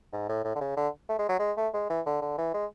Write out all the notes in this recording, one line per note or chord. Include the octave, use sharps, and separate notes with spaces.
G#2
A2
A2
D3
C#3
D3
A3
G#3
F#3
G#3
A3
G#3
E3
D3
D3
E3
G#3